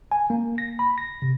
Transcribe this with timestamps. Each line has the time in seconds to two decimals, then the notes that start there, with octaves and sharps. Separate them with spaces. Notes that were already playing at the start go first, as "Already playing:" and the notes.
0.12 G#5
0.30 A#3
0.58 A#6
0.79 B5
0.98 A#6
1.22 C3